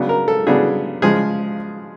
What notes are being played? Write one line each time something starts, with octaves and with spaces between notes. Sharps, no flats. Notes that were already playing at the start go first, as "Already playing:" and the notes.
Already playing: C#3 F#3 B3 D4
A#4
A4
C#3 F#3 B3 D4 G#4
C#3 F3 G#3 G#4